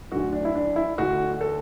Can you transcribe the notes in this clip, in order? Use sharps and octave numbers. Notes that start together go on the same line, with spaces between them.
D2 D3 F#3 F#4
D4
E4
D4
E4
D2 D3 A3 F#4
A4